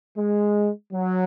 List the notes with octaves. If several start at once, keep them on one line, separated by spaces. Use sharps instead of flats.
G#3
F#3